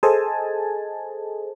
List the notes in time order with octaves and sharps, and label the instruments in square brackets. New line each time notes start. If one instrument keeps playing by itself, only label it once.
[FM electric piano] G#4 A4 C5 D#5 G#5 A5